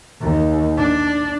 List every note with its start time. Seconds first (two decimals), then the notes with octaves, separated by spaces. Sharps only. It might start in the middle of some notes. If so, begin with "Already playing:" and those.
0.21 D#2
0.78 D4